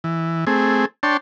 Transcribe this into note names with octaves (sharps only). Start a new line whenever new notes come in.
E3
A3 C4 G#4
D4 C#5 G5 A5 C6